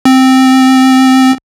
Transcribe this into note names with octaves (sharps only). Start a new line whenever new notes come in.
C4